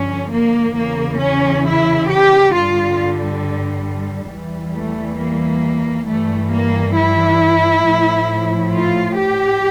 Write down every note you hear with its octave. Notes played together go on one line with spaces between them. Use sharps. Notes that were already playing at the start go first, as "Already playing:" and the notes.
Already playing: G2 D3 F3 C#4
A#3
E2 C#3 E3 A#3
C#4
E4
G4
G2 D3 G3 F4
E2 E3 G3
A3
A#3
G2 E3 G3 A3
A#3
E4
A2 F3
F4
G4